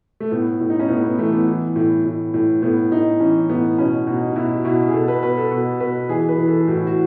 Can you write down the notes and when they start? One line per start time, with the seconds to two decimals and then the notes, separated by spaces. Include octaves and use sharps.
0.20 A3
0.31 A2 B3
0.60 A2
0.70 D#4
0.79 C#4
0.89 A2 B3
1.04 B3
1.18 E3 A3
1.33 B3
1.47 E3
1.76 A2
2.05 A2
2.34 A2
2.62 A2 B3
2.91 A2 D#4
3.20 E3 C#4
3.50 A2 B3
3.78 B2 C#4
4.07 B2 D#4
4.29 D#4
4.36 B2 E4
4.54 F#4
4.65 B2 E4
4.88 G#4
4.93 B2 A4
5.08 B4
5.23 B2 B4
5.37 A4
5.51 B2 A4
5.80 B2 B4
6.09 E3 G#4
6.29 B4
6.38 E3
6.48 A4
6.67 A2 F#4
6.87 F#4